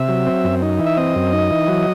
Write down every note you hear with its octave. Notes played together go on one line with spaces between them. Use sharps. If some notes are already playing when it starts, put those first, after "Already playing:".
Already playing: C3 E5
F#3
C4
F#2
D#4
E3
E5
C4 D#5
F#2
D#4
E3
F#3